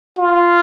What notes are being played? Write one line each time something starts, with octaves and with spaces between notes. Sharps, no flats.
F4